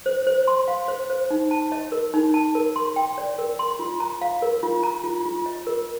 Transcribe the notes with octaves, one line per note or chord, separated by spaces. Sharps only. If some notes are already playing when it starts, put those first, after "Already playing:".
C5
C5
C6
F5
C5
C5
D#4
A5
D#5
A#4
D#4
A5
A#4
C6
G5
D5
A#4
C6
F4
A#5
F5
A#4
F4
A#5
F4
F4
D#5
A#4